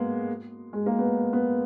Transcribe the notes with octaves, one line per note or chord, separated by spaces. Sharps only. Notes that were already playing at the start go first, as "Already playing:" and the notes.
Already playing: G#3 A#3 B3
G#3
A#3
B3
B3